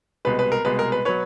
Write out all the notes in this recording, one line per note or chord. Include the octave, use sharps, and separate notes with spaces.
C2 B2 G#3 B4
B4
A#4
C2 B2 G#3 B4
A#4
B4
B2 F#3 B4 C#5